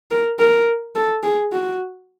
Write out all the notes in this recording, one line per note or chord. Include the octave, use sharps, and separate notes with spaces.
A#4
A#4
A4
G#4
F#4